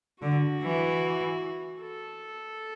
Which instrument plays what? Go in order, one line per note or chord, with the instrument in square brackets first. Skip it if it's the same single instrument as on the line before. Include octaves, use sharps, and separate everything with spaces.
[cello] D3 [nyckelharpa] F#4
[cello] E3
[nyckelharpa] A4